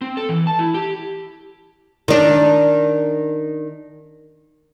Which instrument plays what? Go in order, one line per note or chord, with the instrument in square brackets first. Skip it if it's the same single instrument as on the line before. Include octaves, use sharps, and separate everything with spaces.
[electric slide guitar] C4
A4
E3
A5
E4
G4
[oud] D#3 D4